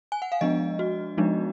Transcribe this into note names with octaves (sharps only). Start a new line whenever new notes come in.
G#5
F#5
F5
F3 G#3 B3 D4 D#5
F#4
F3 G#3 B3 D4 D#4